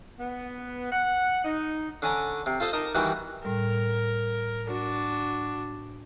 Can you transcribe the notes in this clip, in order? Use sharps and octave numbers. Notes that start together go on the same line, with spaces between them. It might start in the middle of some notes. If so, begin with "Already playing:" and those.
B3
F#5
D#4
D3 C#4 D5 G#5 A#5
C3
F4 A4 C5 D#5
D#4 A#4 D#5 A5 D6
D#3 E3 G3 F#4 B4
A2 G3 A#4
D4 F#4